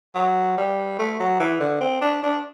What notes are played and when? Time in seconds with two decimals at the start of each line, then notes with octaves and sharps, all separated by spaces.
0.15 F#3
0.57 G3
0.99 A3
1.20 F#3
1.40 E3
1.60 D3
1.81 C4
2.01 D4
2.23 D4